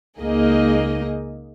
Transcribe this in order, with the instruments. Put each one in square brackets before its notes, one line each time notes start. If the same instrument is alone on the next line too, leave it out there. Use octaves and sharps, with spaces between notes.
[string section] C#2 A#3 D#4 G#4 D#5